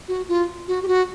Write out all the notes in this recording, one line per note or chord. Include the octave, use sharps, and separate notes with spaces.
F#4
F4
F#4
G4
F#4